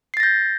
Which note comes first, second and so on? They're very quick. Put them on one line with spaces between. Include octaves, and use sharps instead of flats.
C7 A6 A#6 G6